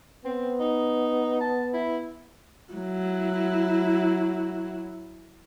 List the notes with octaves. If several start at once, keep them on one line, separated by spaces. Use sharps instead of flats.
B3 C4
D#4
A5
E4
F#3 E4